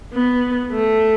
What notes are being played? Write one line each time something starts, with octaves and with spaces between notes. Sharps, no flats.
B3
A3